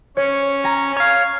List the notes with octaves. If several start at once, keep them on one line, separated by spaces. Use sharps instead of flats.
C#4 C#5
G#5 A#5
C#5 F5